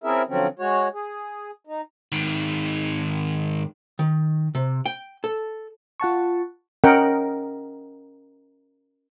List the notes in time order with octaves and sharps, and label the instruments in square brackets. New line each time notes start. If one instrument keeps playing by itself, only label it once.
[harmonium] C4 C#4 E4 G#4 A#4 E5
D3 F3 F#3 C4 C#4
G#3 F#4 C#5
G#4
D#4
[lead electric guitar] G#2 D#3
[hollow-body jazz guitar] D#3
C3
G5
A4
[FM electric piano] F4 F#5 A5 C#6
[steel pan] C#4 A#4 D#5 F#5 G5